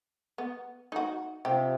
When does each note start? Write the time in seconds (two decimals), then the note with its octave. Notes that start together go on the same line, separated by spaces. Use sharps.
0.38 B3
0.92 D#4 F#4
1.45 C3 F3 G4